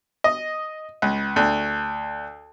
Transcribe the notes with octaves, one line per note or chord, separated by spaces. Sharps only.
D#5
C#2
D2